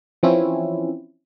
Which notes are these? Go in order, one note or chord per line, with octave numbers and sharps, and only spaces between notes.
E3 F3 C4 C#4 E4